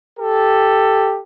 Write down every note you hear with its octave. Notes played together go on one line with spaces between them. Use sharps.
G4 A4